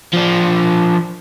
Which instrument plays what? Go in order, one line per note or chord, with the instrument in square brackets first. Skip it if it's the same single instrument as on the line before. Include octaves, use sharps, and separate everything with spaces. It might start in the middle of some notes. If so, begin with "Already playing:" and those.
[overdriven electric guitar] F3 D4